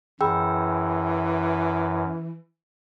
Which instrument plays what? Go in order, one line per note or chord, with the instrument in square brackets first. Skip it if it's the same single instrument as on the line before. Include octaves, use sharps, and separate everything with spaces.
[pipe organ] F#2 [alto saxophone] E3 [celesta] G#4 B5 [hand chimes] G5 E6